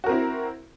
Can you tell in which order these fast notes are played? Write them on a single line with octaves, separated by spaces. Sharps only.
F#4 A#4 C4 E4